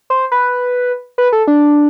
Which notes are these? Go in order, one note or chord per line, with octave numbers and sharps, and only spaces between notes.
C5
B4
B4
A4
D4